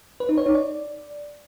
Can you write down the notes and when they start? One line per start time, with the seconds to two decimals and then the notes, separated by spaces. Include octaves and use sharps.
0.20 B4
0.29 D#4
0.37 C#5
0.46 D#4
0.55 D5